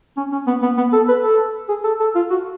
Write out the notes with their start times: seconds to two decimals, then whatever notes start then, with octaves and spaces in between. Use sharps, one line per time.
0.17 C#4
0.32 C#4
0.47 B3
0.62 B3
0.77 B3
0.93 A4
1.08 B4
1.23 A4
1.69 G#4
1.84 A4
2.00 A4
2.15 F4
2.30 F#4